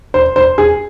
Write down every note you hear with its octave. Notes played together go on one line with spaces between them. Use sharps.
C5
C5
G#4